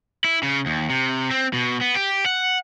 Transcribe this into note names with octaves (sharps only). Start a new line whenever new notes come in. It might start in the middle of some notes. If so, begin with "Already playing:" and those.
E4
C#3
D#2
C3
C4
B2
B3
G4
F#5